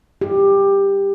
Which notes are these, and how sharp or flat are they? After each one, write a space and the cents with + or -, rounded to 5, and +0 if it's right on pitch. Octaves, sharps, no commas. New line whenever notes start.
G4 +15